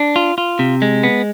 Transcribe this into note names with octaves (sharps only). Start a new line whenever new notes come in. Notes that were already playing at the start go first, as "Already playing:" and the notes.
Already playing: D4
F4
F4
C3
G#3
B3